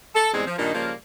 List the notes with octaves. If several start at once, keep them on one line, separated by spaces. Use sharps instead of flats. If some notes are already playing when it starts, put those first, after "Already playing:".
A4
E2 G#2 G3 G#3 C4
F3
G2 A#2 D#3 A#3 D4 D#4
C#3 F3 G3 A#3